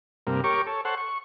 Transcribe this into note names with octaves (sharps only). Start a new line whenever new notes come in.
G2 C3 A#3
G4 A#4 C#5 C#6 D6
A4 C#5
A4 C5 C#5 F#5
C#6